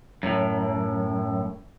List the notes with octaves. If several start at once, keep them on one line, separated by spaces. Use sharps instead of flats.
F#2 A2